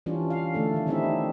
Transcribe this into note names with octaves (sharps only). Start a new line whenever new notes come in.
E3 G3 C#4 D4 F4
F5
D3 A3 D4 A4
D#3 C#4
D#3 G3 C4 D#4 E4 E5